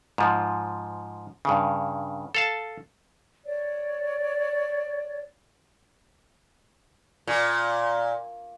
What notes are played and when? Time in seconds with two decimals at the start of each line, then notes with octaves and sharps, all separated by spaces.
0.18 G#2 F3
1.45 G2 C#3
2.35 A4 F5 A5
3.45 C#5 D5
7.27 A#2